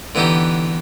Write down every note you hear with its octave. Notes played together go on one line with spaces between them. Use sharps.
D3 E3 B3 D#4 G4